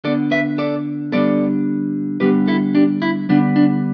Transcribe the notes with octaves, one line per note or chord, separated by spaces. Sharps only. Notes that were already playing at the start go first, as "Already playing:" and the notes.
D3 B3 A4 D5
B4 E5
A4 D5
D3 G3 B3 A4 D5
D3 G3 B3 G4 B4
E4 A4
D4 G4
E4
D3 G3 B3 D4
D4